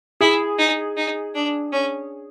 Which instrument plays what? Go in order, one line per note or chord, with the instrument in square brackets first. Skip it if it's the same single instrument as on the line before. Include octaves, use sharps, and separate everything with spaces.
[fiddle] E4 [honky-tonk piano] G#4
[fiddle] D#4
D#4
D4
C#4